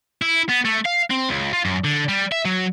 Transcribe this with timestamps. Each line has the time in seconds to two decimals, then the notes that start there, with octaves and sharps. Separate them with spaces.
0.22 E4
0.49 B3
0.65 A3
0.86 F5
1.11 C4
1.29 C#2
1.53 F4
1.65 F#2
1.84 D3
2.08 G3
2.32 E5
2.45 F#3